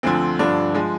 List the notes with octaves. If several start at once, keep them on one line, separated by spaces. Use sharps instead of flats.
D2 D3 F3 C4
G2 D3 F3 D4
F3 G#3